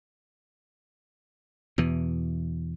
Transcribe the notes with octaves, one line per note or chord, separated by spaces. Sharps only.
E2 B2 E3